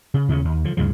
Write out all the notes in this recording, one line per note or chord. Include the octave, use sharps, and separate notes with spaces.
C#3
D#2 C#3 C4 C#4
D#2
D3 F3
D2 G2 C#3 F3